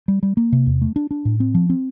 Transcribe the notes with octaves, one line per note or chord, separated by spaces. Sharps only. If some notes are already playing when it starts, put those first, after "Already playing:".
G3
G3
A#3
C3
E2
A3
D4
D4
A2
C4
F3
C4